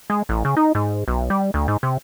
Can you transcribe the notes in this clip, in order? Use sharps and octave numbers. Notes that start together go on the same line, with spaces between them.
G#3
A1
C#3
D#4
G#2
B1
G3
D2
G#2
C3